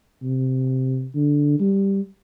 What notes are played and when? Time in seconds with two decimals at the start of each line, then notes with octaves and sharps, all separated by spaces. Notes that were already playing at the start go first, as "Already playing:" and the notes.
0.23 C3
1.15 D3
1.60 G3